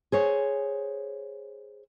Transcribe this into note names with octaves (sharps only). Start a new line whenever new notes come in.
G#4 C5 C#5